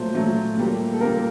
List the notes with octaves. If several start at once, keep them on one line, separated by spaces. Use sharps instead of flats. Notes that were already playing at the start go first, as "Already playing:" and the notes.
Already playing: A#2 F#3 A3 C5
A#2 F#3 A3
A#2 G3 A#3
A4
A#2 G3 A#3 A#4